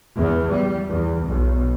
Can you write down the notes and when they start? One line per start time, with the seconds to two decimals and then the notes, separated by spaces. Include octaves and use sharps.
0.17 E2
0.54 G3
0.89 E2
1.27 B1